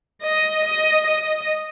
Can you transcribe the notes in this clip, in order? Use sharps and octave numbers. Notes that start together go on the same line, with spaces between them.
D#5
D#5
D#5